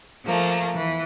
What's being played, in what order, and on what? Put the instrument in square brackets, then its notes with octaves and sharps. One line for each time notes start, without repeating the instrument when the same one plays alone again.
[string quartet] F3 A3 A#3
E3